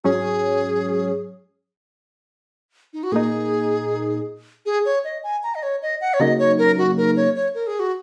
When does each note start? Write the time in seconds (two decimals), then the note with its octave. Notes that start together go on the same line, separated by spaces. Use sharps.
0.04 G#2 F#3 C#4 G#4
2.93 D#4
3.03 F#4
3.12 A#2 A#3 D#4 G#4
4.66 G#4
4.85 C#5
5.04 D#5
5.24 G#5
5.43 A#5
5.55 D#5
5.63 C#5
5.82 D#5
6.01 F#5
6.14 C#5
6.20 C#3 F#3 A#3 D#4 D#5
6.39 C#5
6.58 A#4
6.78 F#4
6.97 A#4
7.17 C#5
7.36 C#5
7.55 A#4
7.67 G#4
7.80 F#4